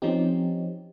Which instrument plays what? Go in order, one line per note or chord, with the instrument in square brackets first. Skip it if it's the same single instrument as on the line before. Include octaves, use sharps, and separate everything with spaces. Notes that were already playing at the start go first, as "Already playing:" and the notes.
[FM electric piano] F3 C4 C#4 D#4 G4